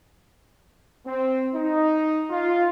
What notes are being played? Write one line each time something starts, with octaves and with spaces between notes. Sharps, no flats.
C4
D#4
F4